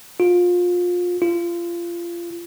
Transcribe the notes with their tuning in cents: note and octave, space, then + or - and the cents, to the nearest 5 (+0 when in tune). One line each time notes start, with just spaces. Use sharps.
F4 +25
F4 -25